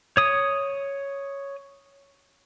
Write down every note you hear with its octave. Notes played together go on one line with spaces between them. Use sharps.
C#5 D#6